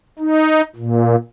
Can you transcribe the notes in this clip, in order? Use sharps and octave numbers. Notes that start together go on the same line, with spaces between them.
D#4
A#2